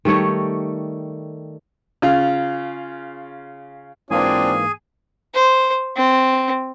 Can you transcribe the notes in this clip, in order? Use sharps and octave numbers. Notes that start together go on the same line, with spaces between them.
D#3 G3 A3 C#5
C#3 F4
G#2 E3 A#3 C4 D4 F4 G#4 G#5
C5
C4